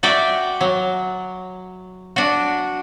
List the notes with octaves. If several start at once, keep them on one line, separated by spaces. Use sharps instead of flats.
F#4 D5 E5 G5
F#3
D4 F#4